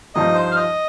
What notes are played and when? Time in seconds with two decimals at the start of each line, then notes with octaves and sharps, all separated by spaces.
0.15 G2 F3 D#4 D#5
0.35 C5
0.51 F5
0.56 D#5